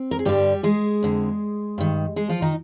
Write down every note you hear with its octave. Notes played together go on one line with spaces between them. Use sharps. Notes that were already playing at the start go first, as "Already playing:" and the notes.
Already playing: C4
A#4
G#4
G2 D3 G3 G4
G#3 G#4
F2 D3
G2 D#3
G#3 G#4
F3 F4
D#3 D#4